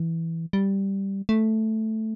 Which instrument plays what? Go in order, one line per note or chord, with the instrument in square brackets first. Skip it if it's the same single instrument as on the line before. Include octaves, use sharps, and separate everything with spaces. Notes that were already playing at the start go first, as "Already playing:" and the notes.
Already playing: [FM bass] E3
G3
A3